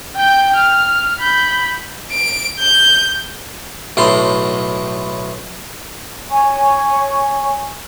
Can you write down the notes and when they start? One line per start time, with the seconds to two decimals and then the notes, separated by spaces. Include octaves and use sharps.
0.16 G5 G6
0.55 F6
1.20 B5 G6
2.12 D7
2.59 G6
3.97 B1 A2 C6
6.30 C#5 G#5 C#6